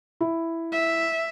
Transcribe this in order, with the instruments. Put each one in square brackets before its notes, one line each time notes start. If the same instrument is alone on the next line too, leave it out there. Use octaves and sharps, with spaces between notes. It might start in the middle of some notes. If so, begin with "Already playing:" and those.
[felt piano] E4
[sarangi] E5